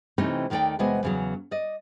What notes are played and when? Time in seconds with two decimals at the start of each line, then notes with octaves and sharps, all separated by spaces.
0.18 C3 E3 A3 C4 C#4 D#4
0.50 D#2 D#3 A3 G#4 D5 G5
0.79 E2 C3 G#3 B3 F#4 D#5
1.03 E2 C#3 F#3
1.51 D5 D#5